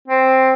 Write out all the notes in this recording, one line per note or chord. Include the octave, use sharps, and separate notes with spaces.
C4